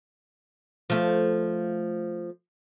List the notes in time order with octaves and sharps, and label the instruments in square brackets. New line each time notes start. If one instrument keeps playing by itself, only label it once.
[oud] F3 A3